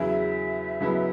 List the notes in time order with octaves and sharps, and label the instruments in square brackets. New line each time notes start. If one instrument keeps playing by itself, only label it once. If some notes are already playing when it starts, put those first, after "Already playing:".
Already playing: [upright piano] E2 C#3 F#3 E4 G#4 [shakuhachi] E5
[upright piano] C#2 C#3 F#3 B3 E4